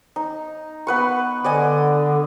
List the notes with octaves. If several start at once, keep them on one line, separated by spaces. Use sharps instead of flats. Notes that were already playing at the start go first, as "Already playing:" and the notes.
D#4
B3 B4 C#6
D3 D5 D#5 G#5